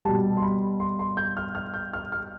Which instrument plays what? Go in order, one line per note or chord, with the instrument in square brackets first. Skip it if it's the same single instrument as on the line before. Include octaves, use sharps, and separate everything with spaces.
[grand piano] B2 G3 A5
C6
B5
C6
C6
G6
F6
F6
G6
F6
F6